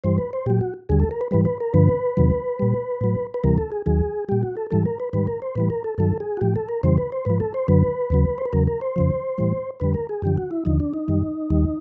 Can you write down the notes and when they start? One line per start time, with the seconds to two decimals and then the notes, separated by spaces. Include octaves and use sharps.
0.04 G2 E3 G3 C5
0.18 B4
0.33 C5
0.46 A#2 F#3 G4
0.61 F#4
0.89 D#2 D3 G3 G#4
1.00 A4
1.11 A#4
1.21 B4
1.31 G#2 E3 G3 B4
1.45 B4
1.60 A#4
1.74 G2 D3 F3 B4
2.17 E2 C3 D#3 F#3
2.60 A#2 G3
3.01 A2 F#3
3.34 B4
3.44 D2 C3 E3 G3 A#4
3.58 A4
3.72 G#4
3.86 D#2 D#3 F#3 G#4
4.29 A#2 G3 G4
4.43 F#4
4.57 A4
4.71 G#2 E3 G3 A4
4.86 A#4
5.00 B4
5.13 G#2 D#3 G3 B4
5.27 A#4
5.42 C5
5.55 A2 E3 G3 B4
5.70 A#4
5.84 A4
5.98 G2 D#3 F#3 A4
6.20 G#4
6.37 F#4
6.41 A2 F3 G4
6.56 A4
6.69 A#4
6.83 F2 C#3 E3 G3 C5
6.98 B4
7.12 C5
7.25 G#2 F3 B4
7.40 A4
7.54 C5
7.68 F#2 D3 F#3 B4
8.10 D#2 C#3 F#3
8.38 C5
8.46 B4
8.53 E2 C#3 F#3 A#4
8.67 A#4
8.81 C5
8.96 F2 C#3 F3
9.38 A2 E3 G3
9.80 F2 D3 G3 B4
9.94 A#4
10.09 G#4
10.22 F#2 D3 F3 G4
10.37 F#4
10.51 E4
10.65 D#2 D3 F3 D#4
10.80 D4
10.94 D#4
11.08 F#2 D#3 G3
11.50 D#2 D#3 G3